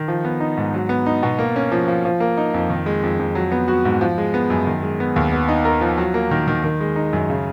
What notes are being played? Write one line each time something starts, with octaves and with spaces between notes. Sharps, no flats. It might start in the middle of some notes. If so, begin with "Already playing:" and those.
Already playing: D#3
F3
B3
D#4
G#2
F#3
B3
D#4
B2
A#3
C#4
F3
F3
F3
A#3
D#4
F2
D#3
G#3
F2
F2
F#3
B3
F#4
G#2
F3
G#3
B3
F#2
D#3
G#3
B3
D#2
B3
D#4
A#4
F3
F#3
A#3
D#3
D#3
D#3
G#3
D#4
F#2
C#3